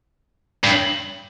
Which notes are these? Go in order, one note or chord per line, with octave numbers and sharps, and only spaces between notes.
G2